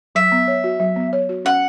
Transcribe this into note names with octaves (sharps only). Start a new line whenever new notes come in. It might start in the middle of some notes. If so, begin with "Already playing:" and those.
F#3 E5
B3
C#5
F#4
F#3
B3
C#5
F#4
C#4 F#5